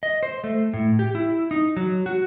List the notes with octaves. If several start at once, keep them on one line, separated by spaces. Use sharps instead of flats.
D#5
C5
A3
A2
G4
E4
D#4
F#3
F#4